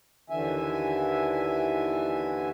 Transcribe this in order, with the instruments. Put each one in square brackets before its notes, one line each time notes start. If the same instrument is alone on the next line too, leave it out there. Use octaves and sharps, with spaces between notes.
[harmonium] D#2 D3 E3 E5 G#5